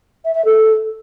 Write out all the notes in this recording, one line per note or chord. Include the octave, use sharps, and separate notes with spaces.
E5
E5
A4